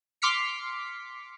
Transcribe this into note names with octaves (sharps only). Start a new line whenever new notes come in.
C6 D6 F6 B6 C#7